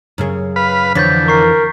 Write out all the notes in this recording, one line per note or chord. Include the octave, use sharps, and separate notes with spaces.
F#2 C#3 G#4
B4 F5 B5 B6
F2 D3 E3 C#5 G6 A6 B6
A#4 C#6 C7